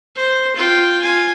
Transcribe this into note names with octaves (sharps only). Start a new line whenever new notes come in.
C5
F4 G5
F4 G#5